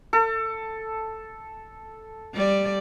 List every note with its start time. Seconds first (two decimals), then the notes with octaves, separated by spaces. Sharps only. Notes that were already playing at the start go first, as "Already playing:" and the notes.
0.13 A4
2.34 G3 D5